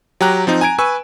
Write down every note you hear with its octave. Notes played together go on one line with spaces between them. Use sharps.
F#3 G4 G5 A#5 F#6
F3 C4 D#4
G#5 A#5 G#6 D7
B4 G#5 C#6 E6